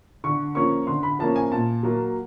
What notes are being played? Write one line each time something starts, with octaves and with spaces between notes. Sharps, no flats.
D3 C#6
F3 A#3 C#4 C#6
D3 C6
B5
F3 A#3 C#4 A5
G#5
A#2 A5
F#3 A#3